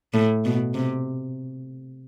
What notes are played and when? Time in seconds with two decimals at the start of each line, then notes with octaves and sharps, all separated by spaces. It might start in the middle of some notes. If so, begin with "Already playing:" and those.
0.14 A2
0.45 B2
0.74 C3